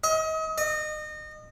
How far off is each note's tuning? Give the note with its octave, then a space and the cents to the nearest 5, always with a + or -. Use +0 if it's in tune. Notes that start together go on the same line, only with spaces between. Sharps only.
D#5 +35
D#5 -30